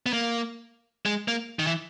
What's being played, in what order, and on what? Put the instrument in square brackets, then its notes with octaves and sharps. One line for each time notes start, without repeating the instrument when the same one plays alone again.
[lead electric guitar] B3
A#3
G#3
A#3
D#3
E3